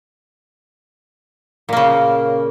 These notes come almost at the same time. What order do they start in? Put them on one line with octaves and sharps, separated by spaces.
A#2 A#3 C#3